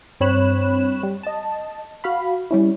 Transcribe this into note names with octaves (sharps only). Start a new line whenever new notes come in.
G2 C4 C#5 B5 F#6 E7
G3
D#5 A5
F#4 F5 B5
G3 C#4 E4